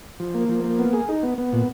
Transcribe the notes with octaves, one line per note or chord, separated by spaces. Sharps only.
F3
A#3
F3
A#3
B3
G#4
D#4
B3
B3
A#2